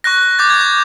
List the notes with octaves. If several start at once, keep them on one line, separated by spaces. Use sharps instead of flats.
C#6 F#6 A#6
D6 G6 A6
G#6
G6